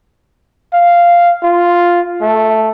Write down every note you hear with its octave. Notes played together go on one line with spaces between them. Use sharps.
F5
F4
A3